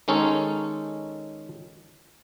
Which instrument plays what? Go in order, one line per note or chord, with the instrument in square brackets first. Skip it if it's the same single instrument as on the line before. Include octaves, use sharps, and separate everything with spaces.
[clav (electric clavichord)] D#3 G#3 C#4 D#4 A4 C#5